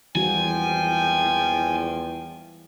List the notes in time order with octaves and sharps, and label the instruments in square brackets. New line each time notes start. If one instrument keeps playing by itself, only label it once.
[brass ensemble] G#1 F3 G5 [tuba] E2 [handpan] E3 G3 F#4 [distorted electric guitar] G#5